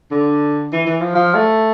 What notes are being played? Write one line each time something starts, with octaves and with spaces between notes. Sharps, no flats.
D3
E3
E3
F3
F3
A3